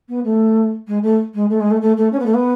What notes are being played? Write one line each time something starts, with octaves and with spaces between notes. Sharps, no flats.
B3
A3
G#3
A3
G#3
A3
G#3
A3
A3
A3
C#4
B3
A3
B3